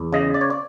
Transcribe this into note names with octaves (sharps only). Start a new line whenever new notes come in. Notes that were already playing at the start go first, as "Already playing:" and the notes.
Already playing: E2
C#3 D#5
D5
C#5
D5